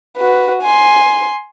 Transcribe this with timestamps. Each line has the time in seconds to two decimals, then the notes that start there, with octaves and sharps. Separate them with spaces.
0.17 F#4 B4
0.62 G#5 C6